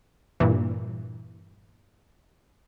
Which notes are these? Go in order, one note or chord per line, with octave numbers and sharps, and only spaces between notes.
G2 A#2 E3